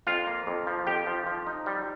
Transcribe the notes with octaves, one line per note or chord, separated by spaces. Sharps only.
F2 F4 F5
A#3
F2
F3
F2 G4 G5
F3
F3
D#4
G3